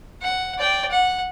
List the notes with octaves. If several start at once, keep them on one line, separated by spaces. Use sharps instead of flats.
F#5
D5 G5
F#5